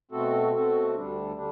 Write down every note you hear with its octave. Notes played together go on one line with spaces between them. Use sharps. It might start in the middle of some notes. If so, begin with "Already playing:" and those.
B2 A3 C4 F#4 A4
B2 A3 C4 F#4 A4
D2 D3 G3 D4
D3 G3 D4